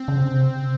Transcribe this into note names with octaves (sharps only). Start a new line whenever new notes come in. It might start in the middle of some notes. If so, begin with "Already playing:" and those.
Already playing: C4
C#3
C3
C#3
C3